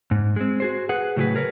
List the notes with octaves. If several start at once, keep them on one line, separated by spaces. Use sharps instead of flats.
G#2
G#3 C4
F#4 G#4 C5
G#4 B4 F#5
A2 C#3 F#3 G4 G#4 B4
G#4 A#4 B4 C#5